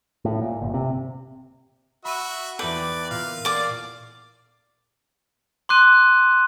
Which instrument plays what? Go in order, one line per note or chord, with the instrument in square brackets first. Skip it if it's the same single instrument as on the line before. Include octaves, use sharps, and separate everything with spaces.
[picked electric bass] A2
A#2
G1
C3
[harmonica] F#4 E5 [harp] B5 D#7
[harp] E2 G5 [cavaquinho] B4 [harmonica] D5
[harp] A#2 [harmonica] F5
[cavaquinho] D5 D6
[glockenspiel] C6 D6 F#6 D#7